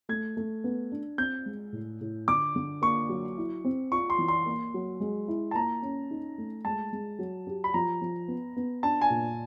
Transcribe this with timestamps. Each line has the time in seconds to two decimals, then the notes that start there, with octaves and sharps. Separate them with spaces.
0.09 A3 G#6
0.37 A3
0.64 B3
0.92 D4
1.18 C4 G6
1.46 G#3
1.73 A2
2.01 A2
2.28 D3 D6
2.56 D3
2.82 A#3 C#6
3.09 F#3
3.37 E4
3.65 C4
3.92 F4 C#6
4.10 C6
4.19 E3
4.28 C6
4.46 A#3
4.74 F#3
5.00 G#3
5.28 E4
5.51 A5
5.55 A#3 A#5
5.83 C#4
6.11 D#4
6.38 A3
6.65 G#3 A5
6.93 G#3
7.19 F#3
7.47 G4
7.64 B5
7.74 F3 A#5
8.02 F3
8.28 B3
8.56 B3
8.83 D4 A5
9.01 G#5
9.10 A#2